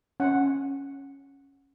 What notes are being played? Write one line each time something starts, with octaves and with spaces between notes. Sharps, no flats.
C#4 F#5